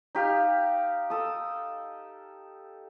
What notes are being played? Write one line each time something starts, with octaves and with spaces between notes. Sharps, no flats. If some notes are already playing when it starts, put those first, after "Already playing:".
D#4 G4 F5
A4 D#6